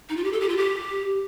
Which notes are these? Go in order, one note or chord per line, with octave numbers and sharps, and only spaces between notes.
D#4
F4
G4
A4
G4
F4
G4